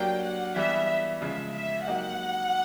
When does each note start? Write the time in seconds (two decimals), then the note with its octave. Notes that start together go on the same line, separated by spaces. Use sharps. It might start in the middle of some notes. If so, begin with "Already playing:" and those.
Already playing: F#3 A#3 D4 G4 G5
0.24 F#5
0.56 E3 G3 B3 E5
1.22 C#3 F3 G#3 E5
1.54 E5
1.87 F#3 A#3 D#4 G4 F#5